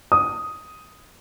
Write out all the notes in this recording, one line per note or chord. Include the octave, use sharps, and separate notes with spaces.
D#6